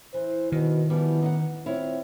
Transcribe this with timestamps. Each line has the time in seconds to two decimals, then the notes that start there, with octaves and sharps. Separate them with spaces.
0.14 E3 C5
0.52 B2 D#3
0.90 E3 F3 G3 B3
1.22 D#4 D#5 F#5
1.66 C4 E4 F4 C#5